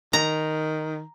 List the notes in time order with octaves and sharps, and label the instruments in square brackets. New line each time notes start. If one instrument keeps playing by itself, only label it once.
[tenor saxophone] D#3 [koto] A#5